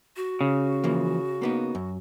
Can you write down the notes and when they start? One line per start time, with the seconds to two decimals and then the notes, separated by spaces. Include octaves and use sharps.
0.16 F#4
0.41 C#3
0.84 E3 F3 A#3
1.42 A#3 B3 D#4
1.75 F#2